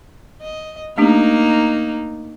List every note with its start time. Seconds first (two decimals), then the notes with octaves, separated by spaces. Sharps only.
0.42 D#5
0.98 A3 A#3 D4 D#4 G4